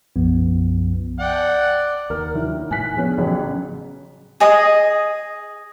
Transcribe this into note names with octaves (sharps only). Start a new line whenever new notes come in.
B1 F#2 F3 B3
D5 F#5 G5
D#2 A#4 F6
D#3 F#3 E4
A2 D#3 G#5 F#6 B6
F3 B3 C#4 D4 G#4
A1 C#3 F#3
G#4 D#5